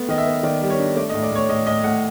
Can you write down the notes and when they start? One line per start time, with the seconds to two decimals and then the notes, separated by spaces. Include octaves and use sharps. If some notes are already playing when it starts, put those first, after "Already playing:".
Already playing: A3 B3
0.08 D#3 D#5
0.18 E5
0.26 B3
0.43 D#3 D5
0.62 G3
0.70 C#5
0.79 D4
0.96 A3 D5
1.09 D#5
1.14 A2
1.23 D5
1.32 A2 C#5
1.49 A2 D#5
1.66 A2 D#5
1.84 A2 F#5